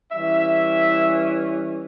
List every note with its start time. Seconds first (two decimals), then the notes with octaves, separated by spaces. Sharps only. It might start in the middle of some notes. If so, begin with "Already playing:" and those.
0.12 E3 G3 C#4 E5